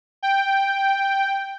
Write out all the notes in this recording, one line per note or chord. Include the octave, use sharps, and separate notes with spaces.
G5